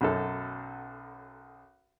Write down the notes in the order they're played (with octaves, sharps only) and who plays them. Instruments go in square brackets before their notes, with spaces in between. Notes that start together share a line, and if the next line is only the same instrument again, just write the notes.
[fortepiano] B1 F#2 A4